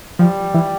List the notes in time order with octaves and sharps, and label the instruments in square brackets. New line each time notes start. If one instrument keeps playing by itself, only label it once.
[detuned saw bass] F3 [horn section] G3
[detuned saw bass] E3